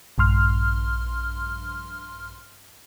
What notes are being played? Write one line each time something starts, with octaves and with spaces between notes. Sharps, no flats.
A#1 G2 C6 F6